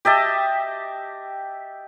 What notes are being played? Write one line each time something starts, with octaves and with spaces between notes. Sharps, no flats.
G4 D#5 E5 A5